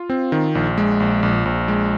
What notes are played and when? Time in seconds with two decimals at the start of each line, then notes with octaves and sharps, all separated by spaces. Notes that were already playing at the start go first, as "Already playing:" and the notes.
Already playing: F4
0.10 C4
0.32 D#3
0.55 A#1
0.78 G#3
1.00 A#1
1.23 A#1
1.45 A#1
1.68 G#3